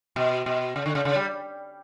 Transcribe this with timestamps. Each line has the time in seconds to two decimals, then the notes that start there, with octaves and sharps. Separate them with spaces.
0.16 B2
0.46 B2
0.76 C#3
0.86 D3
0.95 C#3
1.05 C#3
1.16 G3